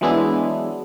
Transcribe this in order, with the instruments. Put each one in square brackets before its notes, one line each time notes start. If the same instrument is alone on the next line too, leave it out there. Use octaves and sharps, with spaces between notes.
[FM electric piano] E3 F#3 G#3 B3 D4 E4